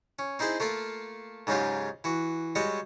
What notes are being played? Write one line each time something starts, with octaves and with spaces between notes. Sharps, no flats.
C#4
C4 D#4 E4 G#4 C5
A3 A#3 F4 A4
G#2 C#3 F#3 D#4 F4 G4
E3 F#4
G3 G#3 F#4 C#5 D#5